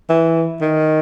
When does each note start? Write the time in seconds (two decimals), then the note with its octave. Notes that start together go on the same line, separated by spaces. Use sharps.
0.10 E3
0.61 D#3